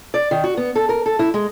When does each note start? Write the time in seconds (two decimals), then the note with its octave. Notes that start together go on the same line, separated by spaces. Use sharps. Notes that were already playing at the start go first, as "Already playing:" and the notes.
0.14 D5
0.31 D#3
0.44 F#4
0.57 B3
0.75 A4
0.89 A#4
1.06 A4
1.19 E4
1.34 G#3